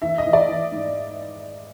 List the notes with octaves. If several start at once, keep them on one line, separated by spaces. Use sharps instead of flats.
E3 E5
D#5
E3
D5
E3
G#2